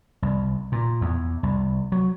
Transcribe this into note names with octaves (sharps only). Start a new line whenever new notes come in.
C2
A#2
E2
C2
F#3